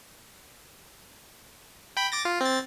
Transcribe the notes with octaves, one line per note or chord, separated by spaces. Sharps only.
G5 B5
D6 A6 A#6
F4
C4 A6